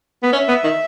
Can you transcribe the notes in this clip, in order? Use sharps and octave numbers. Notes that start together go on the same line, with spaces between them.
B3
C#4 E5
B3
D#3